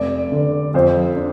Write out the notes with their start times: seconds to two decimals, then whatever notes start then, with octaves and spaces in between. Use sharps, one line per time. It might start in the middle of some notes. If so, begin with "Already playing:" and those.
Already playing: F1 D5
0.32 D3
0.74 F2 C5
1.17 D4